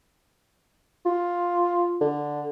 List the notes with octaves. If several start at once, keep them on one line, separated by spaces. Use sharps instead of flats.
F4
D3